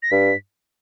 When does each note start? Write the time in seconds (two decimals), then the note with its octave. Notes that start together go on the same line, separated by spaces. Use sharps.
0.03 A#6
0.11 G2 B6